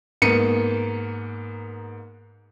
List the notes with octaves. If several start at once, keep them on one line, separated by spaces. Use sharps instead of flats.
G#2 A#3 B3 C#7 D#7